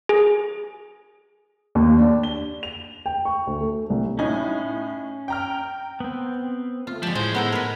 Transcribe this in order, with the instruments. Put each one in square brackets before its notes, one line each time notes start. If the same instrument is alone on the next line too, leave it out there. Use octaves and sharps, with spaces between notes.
[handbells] G#4
[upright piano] D#2
D4
G7
F7
G5
C#6
D2
A3
C2
[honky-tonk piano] A2 D#4 [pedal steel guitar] C#4
[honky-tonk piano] G5 A#5 F6
[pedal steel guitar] B3 C4
[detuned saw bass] A3 [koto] F4
[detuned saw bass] F3 [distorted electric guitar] G3 [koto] G#3 A5
[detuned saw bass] A2 [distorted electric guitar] G#3 C#4 [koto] G#4 [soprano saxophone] C5
[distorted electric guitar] G#3 [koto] B3 D#4 A4
[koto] A#4 B4